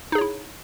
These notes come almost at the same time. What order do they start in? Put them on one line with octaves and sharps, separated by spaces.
D#4 G#4 C#5 E4